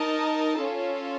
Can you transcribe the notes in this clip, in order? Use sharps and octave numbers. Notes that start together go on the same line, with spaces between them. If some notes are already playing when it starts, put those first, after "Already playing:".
Already playing: D#4 A#4 D#5 A5
C#4 F4 A4